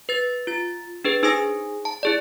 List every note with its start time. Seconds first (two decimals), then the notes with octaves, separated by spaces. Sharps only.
0.09 B4 A6
0.47 F4 A6
1.05 D4 G#4 B4
1.23 D#4 G#4 C5 G#5 D#6 A#6
1.85 A5
2.03 E4 G#4 D5